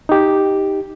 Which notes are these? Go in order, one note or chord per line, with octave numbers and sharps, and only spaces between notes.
D#4 G4